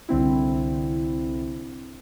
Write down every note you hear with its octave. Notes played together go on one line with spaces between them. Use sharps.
C2 D3 C4 E4